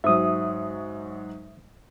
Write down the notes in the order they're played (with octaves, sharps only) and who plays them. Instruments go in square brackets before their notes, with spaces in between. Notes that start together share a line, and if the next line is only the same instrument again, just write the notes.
[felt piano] G#2 F#3 [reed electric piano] E5 D#6